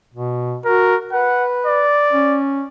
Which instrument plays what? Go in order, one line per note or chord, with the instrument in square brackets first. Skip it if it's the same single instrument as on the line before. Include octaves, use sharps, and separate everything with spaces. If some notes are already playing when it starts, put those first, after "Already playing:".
[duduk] B2
[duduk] F#4 [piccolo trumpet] A#4
[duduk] B4 [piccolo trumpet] F#5
[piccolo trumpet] D5
[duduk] C#4